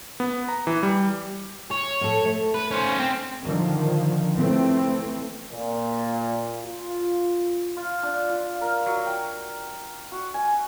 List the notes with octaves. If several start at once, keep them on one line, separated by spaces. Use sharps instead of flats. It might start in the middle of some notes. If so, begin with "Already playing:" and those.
B3
A#5
E3
G3
C#5
A2 A4
A3
B4
C#4 C5
C4
D3 D#3 F3
E3 A3 C4
A#2
F4
F4
D4
F4
A#4
F#3
G5
F#4
G#5